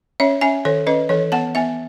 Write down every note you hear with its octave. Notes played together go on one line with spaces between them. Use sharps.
C#4 C#5 E5
C#4 E5 G#5
D#3 A4 C#5
C#4 B4 D#5
E3 A4 C#5
B3 F#5 A5
B3 E5 G#5